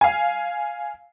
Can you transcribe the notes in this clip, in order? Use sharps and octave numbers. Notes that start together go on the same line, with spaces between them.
F5 G#5